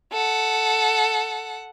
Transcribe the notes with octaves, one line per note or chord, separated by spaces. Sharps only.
A4 F#5